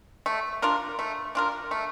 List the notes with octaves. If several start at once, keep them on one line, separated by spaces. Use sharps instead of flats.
A3
D4 F4 A#4
A3
D4 F4 A#4
A3